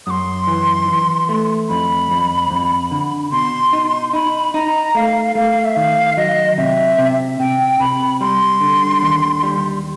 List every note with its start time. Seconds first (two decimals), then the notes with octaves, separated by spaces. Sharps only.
0.06 F#2 C6 D#6
0.47 E3
0.88 E3
1.29 A3
1.69 F2 B5
2.11 F2
2.51 F2
2.91 D3
3.32 B2 C6
3.73 D#4
4.13 D#4 B5
4.54 D#4 A#5
4.95 A3 F5
5.35 A3 F5
5.65 E5
5.76 D#3 F5
6.17 F#3 D#5
6.57 C3 E5
6.99 C3
7.40 C3 G5
7.80 C3 B5
8.21 G3 C6
8.61 D3
9.02 D#2
9.43 G3